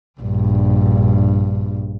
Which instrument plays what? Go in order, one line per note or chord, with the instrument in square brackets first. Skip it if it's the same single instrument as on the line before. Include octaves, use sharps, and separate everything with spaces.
[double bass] A#1 G2